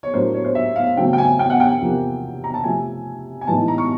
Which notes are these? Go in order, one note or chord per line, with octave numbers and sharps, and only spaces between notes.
C#5
A2 F#3 A#3 D4 C5
C#5
C5
E5
F5
E2 C#3 F#3 A3 C4 G5
G5
G#5
G5
F#5
G5
E2 C3 F3 A#3
A#5
A5
C3 F3 A3 G#5
G#5
A2 E3 G#3 B3 D#4 A5
A#5
C#6